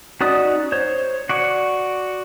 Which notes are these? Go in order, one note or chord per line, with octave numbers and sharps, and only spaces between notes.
C#4 D#4 F#4 D5 D#6
C5 C#5
F#4 D5 C#6